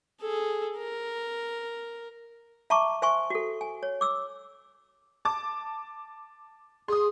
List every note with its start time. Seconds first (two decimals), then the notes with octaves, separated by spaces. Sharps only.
0.21 G#4 A4
0.77 A#4
2.70 E5 A5 A#5 C#6 D6
3.02 C5 E5 G#5 C6 C#6
3.30 F#4 A4
3.61 G#5
3.83 C#5
4.01 D6 E6
5.25 A5 D6
6.88 G#4 C6 D#6